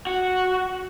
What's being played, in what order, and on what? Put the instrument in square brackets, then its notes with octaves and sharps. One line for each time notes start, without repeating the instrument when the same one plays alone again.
[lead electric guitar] F#4